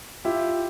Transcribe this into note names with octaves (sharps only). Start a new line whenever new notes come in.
E4 F4 G4